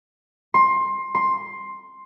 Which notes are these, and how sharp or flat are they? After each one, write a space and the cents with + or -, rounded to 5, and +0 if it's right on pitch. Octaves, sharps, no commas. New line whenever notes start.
C6 +20
C6 +10